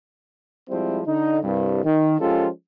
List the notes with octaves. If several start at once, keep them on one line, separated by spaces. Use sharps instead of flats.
F3 G3 G#3 C4 E4
D3 D#4
C2 G2
D#3
F3 G#3 C#4 F4 G4 A4